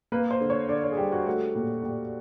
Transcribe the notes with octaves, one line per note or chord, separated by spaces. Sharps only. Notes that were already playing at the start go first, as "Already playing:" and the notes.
A#3 B4
C5
D3
C#5
D3 D5
C#5
G#4
G3 G4
F#4
A3 F#4
A#2 G4
A#2 G4